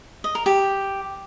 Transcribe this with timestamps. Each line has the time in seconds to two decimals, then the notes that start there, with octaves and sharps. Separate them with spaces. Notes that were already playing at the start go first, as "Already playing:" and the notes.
0.24 D#5
0.35 A#4
0.46 G4